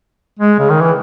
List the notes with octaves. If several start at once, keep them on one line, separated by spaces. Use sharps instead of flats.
G#3
C#3
D#3
E3